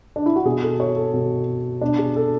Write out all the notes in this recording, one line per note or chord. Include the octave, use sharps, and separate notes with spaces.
D4
E4
F#4
B2 G#4
A4
C#5
A4
B2
B2 D4
G#4
A4